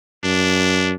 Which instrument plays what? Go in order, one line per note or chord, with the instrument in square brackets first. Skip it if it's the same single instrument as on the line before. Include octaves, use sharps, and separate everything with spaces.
[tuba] F#2 [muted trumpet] D4